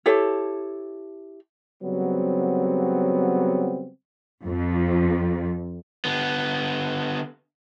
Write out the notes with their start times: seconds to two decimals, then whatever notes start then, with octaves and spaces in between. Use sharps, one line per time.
0.06 E4 G4 A4 C#5
1.83 C#3 F#3 G3 B3 C4
4.45 F2
6.05 D3 B3